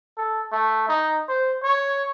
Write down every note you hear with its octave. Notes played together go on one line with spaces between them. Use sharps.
A4
A3
D#4
C5
C#5